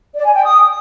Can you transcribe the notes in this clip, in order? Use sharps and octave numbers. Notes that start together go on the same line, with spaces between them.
D5
G#5
G5
D#6